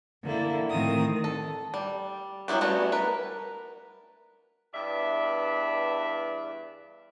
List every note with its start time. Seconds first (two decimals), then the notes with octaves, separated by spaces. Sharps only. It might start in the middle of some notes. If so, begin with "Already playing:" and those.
0.23 D3 A#3 E4
0.70 A2 D#3 C4 A#4 D#6
1.24 A4
1.74 G3
2.48 F#3 B3 E4 F#4 G4
2.61 G3 A3 B3 C#4 F#4
2.92 A#4 B4
4.74 E2 G2 D5 E5